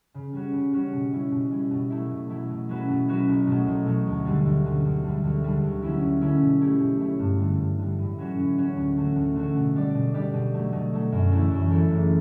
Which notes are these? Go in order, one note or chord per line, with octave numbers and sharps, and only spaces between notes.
C#3
G3 C#4 F#4 C#5
C#3
G3 C#4 F#4 C#5
B2
G3 C#4 E4
B2
G3 C#4 E4
B2
F#3 A3 E4
B2
F#3 A3 E4
B2
F#3 C#4 F#4 B4
B2
F#3 C#4 F#4 B4
B1
B2 F#3 A3
B1
B2 F#3 A3
D2
D3 G3
D2
D3 G3
D2
D3 G3
D2
D3 G3
D2
D3 F#3 C#4 E4
D2
D3 F#3 C#4 E4
B2
A3 E4 G4 C#5
B2
A3 E4 G4 C#5
G2
D3 G3
G2
D3 G3
A2
F#3 C#4 F#4 C#5
A2
F#3 C#4 F#4 C#5
D2
D3 A3 C#4 F#4
D2
D3 A3 C#4 F#4
B2
G3 D4 G4 D5
B2
G3 D4 G4 D5
B2
F#3 A3
B2
F#3 A3
F#2
E3 A3 E4 A4
F#2
E3 A3 E4 A4
F#1